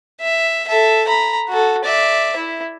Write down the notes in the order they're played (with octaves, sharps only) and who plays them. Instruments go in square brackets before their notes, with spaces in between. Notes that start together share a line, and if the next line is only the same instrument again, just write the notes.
[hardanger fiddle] E5
A4 E5
A#5 B5
F#4 A4
D5 E5
E4